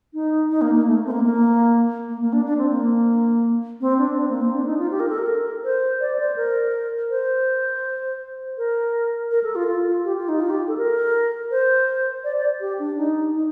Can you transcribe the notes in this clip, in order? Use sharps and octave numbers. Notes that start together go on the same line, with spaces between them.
D#4
D#4
A#3
A#3
A3
C4
A#3
A#3
A#3
A#3
D4
D4
C4
A#3
C4
D4
C4
A#3
C4
D4
D#4
F4
G4
A#4
A4
A#4
C5
D5
C5
A#4
C5
A#4
A#4
A4
F4
F4
G4
F4
D#4
F4
G4
A4
A#4
C5
D5
D5
G4
D4
D#4
D#4